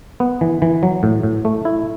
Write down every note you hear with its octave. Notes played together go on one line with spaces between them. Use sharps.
B3
E3
E3
F#3
A2
A2
A3
E4